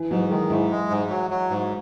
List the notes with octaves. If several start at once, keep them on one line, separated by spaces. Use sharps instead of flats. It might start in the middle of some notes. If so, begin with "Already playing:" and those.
Already playing: E3
G#2 F#3
D#3 G#3
G#2 E4
G#3
G#2
F#3
F#3
G#2